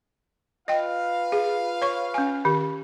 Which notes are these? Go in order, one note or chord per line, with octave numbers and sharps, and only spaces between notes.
F4 B4 D#5 F5 G5
G#4
C#5 C#6
C#4 G#5
D#3 G4